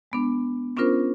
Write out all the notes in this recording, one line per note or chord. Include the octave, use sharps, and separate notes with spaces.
G#3 B3 D4
B3 C#4 D4 F4 A#4 C5